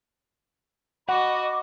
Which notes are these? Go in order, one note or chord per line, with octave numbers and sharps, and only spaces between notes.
F#4 D#5 F#5 B5 D6